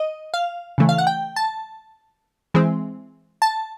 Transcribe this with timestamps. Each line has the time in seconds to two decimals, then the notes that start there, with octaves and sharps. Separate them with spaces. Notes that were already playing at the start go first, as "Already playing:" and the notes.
Already playing: D#5
0.34 F5
0.78 C#3 E3 A3
0.89 F5
0.98 F#5
1.07 G5
1.36 A5
2.54 E3 G#3 C4
3.42 A5